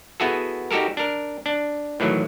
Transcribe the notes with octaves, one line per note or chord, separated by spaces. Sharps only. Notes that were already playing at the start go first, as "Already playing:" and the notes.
B3 E4 F#4 G#4 A4
D#4 F#4 G4 A4 A#4
D4 A#4
D4
A2 D#3 E3 F#3